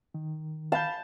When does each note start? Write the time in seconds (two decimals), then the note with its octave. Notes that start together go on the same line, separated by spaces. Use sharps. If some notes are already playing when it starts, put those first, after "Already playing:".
0.14 D#3
0.72 F5 A5 B5 G6